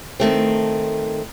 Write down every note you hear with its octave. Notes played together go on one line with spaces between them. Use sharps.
D#3 A3 C4